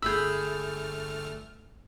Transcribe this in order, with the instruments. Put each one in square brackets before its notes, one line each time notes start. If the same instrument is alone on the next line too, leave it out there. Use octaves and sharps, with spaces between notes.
[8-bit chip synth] G1 A3 F6 [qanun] G#4 B5 [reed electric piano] E6 G6